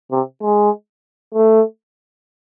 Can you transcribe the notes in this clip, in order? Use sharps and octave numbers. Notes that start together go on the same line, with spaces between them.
C3
G#3
A3